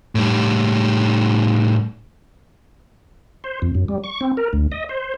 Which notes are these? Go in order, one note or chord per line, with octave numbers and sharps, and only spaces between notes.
A2 G3
C5
F2
F#2
G3
C#6
C4
A#4
D2
D#5
C5